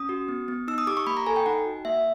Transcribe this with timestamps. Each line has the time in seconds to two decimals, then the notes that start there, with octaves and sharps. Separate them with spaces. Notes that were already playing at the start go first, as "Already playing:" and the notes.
Already playing: C#4 D#6
0.09 F#4
0.28 B3
0.48 B3
0.68 D#4 E6
0.78 D#6
0.87 G4 D6
0.97 C#6
1.07 A#3 B5
1.17 A#5
1.26 A4 G#5
1.36 G5
1.46 D#4 F#5
1.65 F#4
1.85 A#3 E5